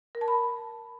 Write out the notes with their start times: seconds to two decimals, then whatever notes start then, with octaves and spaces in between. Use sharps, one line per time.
0.15 A#4
0.21 A5
0.28 B5